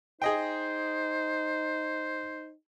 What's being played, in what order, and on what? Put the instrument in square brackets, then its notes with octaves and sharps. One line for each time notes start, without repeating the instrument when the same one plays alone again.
[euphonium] D#4 [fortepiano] G#4 D#5 G5 [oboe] C5